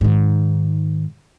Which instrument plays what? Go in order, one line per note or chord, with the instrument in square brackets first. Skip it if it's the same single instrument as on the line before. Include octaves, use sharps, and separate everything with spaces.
[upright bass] G#2 D#3